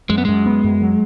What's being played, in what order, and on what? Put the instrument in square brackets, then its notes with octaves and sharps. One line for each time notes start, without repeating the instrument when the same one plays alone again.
[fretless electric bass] F#2 [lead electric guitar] G#3
[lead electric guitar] B3
[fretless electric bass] F#2 [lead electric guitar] G#3
[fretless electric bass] B3
F#2
F#3